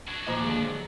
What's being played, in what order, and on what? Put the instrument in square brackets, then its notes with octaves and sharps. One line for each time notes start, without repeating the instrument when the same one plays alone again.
[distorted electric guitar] D4 F#4 [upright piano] G#6 A#6
[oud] D#2 A#2 F3 [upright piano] D#5 A#5 D6
[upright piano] D3 G#3
[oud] F#3